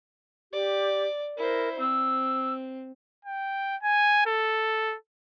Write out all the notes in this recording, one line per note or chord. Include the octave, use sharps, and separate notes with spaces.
G4 D5
E4 A#4 C5
C4 E6
G5
G#5
A4